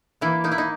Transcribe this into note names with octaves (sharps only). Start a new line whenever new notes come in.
E3 A#3 E4
A#3 D#4
E4
D#4